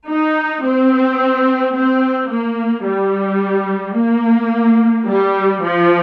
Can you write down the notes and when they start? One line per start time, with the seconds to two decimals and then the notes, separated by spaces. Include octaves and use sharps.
0.08 D#4
0.64 C4
1.74 C4
2.30 A#3
2.85 G3
3.96 A#3
5.06 G3
5.62 F3